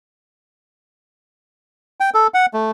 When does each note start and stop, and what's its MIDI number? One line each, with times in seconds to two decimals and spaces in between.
2.00 2.10 79
2.14 2.27 69
2.34 2.46 78
2.54 2.71 57